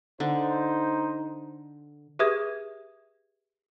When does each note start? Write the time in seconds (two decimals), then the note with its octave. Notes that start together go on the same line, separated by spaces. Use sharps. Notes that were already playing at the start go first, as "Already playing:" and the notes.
0.20 D3 D#4 C5
2.19 G4 G#4 B4 E5 D#6 G#6